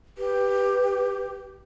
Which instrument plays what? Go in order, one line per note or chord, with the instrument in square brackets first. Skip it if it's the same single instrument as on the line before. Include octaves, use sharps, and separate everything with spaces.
[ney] G4 [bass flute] B4